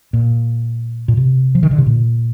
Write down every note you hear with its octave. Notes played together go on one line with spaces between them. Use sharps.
A#2
A#2
C3
F3
D#3
D3
C3
A#2